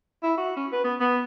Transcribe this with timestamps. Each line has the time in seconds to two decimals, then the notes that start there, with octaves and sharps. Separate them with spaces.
0.23 E4
0.38 F#4
0.56 C#4
0.72 B4
0.84 B3
1.00 B3